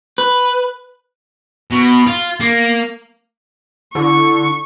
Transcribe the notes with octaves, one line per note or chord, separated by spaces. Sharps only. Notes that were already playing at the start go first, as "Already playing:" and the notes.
B4
B2
F4
A#3
D3 E4 C#6